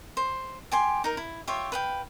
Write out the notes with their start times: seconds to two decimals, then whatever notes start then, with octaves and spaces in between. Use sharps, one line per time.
0.17 C5
0.72 G4 G#5 C6
1.04 D#4 A#4
1.17 E4
1.47 F4 G4 C#5 E5
1.72 B4 F5 G5